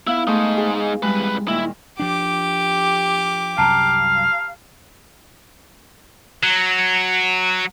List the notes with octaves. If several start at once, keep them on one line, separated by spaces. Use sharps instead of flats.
B3 E4 F5
G#3 A3 D#4 C#6
G#4
C2 G3 G#3 B4
A#2 D#3 E4
F3 D4 G4 D6
C2 F#2 C3 F5 A5 A#5
F#3